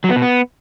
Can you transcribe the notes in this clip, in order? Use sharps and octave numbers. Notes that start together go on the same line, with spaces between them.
F#3
B3
B2
B3